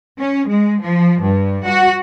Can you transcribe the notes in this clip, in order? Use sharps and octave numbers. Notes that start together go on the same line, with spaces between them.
C#4
G#3
F3
G2
F#4